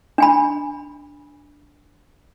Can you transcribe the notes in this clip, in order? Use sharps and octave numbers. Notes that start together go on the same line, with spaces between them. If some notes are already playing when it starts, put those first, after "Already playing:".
D4 G#5 B5